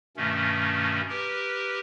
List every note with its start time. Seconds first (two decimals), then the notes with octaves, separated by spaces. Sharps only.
0.17 G2 B2 D#3 A3 C#4
1.09 G4 A#4 B4